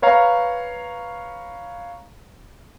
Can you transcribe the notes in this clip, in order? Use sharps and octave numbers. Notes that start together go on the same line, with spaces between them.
B4 C#5 F5 A#5